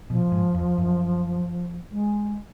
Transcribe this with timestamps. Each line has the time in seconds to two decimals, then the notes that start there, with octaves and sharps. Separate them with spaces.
0.10 B2 F3
0.32 G#2
0.54 F2
0.78 F#2
1.91 G#3